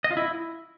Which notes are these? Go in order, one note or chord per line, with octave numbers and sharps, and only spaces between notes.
D#5
F4
E4